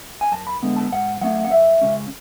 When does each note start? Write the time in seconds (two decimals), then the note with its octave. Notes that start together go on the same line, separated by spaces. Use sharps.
0.21 G#5
0.32 F#2 A5
0.47 B5
0.63 D3 G#3 B3
0.76 A5
0.92 G#2 F#5
1.21 F#3 A3 C#4 F#5
1.45 F#5
1.51 F#2 E5
1.81 C#3 G#3 C#4